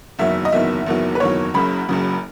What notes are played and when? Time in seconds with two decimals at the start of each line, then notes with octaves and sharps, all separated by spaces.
0.19 F#1 E2 D#3 F#3 E5
0.45 D#5
0.52 F#1 E2 D#3 F#3 E5
0.86 F#1 E2 D#3 F#3
1.15 B4
1.20 F#1 E2 D#3 F#3 C#5
1.54 F#1 F#2 C#3 F#3 B5
1.89 F#1 F#2 C#3 F#3